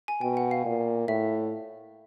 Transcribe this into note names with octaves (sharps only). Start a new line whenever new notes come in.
G#5
B2 G5
F#5
F5
A#2
A2 E5